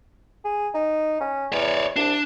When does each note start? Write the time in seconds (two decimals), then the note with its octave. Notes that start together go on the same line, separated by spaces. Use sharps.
0.44 G#4
0.74 D#4
1.20 C#4
1.52 E2 C#5 D5
1.96 C2 D4